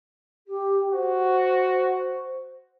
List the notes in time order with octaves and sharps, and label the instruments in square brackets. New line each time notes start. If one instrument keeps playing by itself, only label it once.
[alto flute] G4
[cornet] F#4 [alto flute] C5